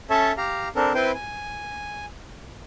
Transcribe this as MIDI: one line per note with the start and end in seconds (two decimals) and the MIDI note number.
0.10 0.32 61
0.10 0.32 69
0.10 0.32 73
0.10 0.32 76
0.10 0.32 81
0.37 0.68 67
0.37 0.68 77
0.37 0.68 82
0.76 0.93 60
0.76 0.93 62
0.76 0.93 69
0.76 0.93 70
0.95 1.12 60
0.95 1.12 64
0.95 1.12 71
0.95 1.12 72
0.95 1.12 79
0.95 1.12 84
1.14 2.06 80